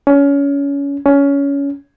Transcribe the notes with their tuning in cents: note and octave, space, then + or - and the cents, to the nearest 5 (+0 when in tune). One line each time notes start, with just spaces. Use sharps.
C#4 +25
C#4 +20